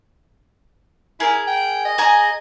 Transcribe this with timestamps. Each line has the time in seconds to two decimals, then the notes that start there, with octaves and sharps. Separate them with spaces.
1.20 E4 G#4 A#4
1.47 G5
1.85 D#5
1.98 G#4 G#5 A#5